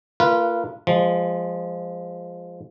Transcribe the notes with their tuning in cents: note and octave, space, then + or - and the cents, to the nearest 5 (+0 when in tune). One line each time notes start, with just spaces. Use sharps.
A#3 -45 F4 -20 B4 -25
F3 +0 G#3 -20